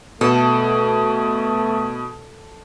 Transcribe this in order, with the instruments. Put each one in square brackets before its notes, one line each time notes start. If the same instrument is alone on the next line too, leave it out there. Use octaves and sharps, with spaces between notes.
[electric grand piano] B2 [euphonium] A3 [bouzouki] A4